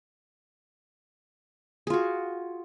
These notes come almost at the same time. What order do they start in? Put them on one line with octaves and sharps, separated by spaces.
G#4 F4 F#4